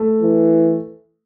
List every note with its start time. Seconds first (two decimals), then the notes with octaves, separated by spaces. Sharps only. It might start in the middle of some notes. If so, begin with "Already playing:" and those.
Already playing: A3
0.22 E3